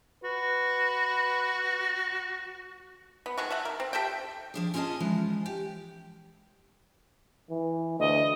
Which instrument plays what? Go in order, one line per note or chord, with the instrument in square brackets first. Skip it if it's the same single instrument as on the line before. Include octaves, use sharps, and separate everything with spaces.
[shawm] F#4 [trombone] B4
[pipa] B3
D#3 G#3 F#4
A3 E5 F#5
A#4
C4
G4 A4 E5 G5
[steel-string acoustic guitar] F3 D4 G#4
C#4 F4 G#4 A#4 D#5 A5
E3 F3 G#3
G4
[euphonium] E3
[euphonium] D2 [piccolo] D#5